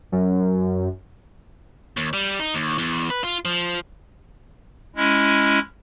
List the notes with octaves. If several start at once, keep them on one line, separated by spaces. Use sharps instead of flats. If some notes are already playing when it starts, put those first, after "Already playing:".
F#2
D#2
G3
D#4
D#2
E2
B4
F4
F3
G#3 C#4 E4